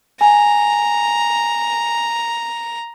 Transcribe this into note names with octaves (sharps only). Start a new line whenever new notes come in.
G#5 A#5